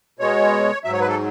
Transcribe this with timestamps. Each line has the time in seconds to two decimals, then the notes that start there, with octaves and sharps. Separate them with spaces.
0.19 B2 G#3 C#5
0.84 G#2 F#3 E5
0.92 C#5
1.00 B4
1.09 A4